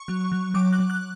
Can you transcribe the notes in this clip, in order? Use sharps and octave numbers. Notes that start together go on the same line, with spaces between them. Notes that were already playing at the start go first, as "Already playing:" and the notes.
Already playing: C#6
F#3
F#3
F#3 D6
F#6
F#3
F#6